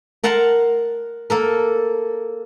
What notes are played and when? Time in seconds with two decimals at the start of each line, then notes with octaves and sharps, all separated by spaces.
0.24 A#4 F#5 A5 A#5 C6
1.30 A#3 A4 A#4